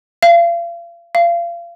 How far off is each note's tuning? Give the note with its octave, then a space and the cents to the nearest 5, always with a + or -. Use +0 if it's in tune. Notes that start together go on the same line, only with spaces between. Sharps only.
F5 -40
F5 -30